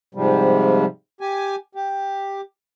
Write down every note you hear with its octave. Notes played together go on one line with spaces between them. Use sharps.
G#2 C3 F3 G3
G4 G#5
G4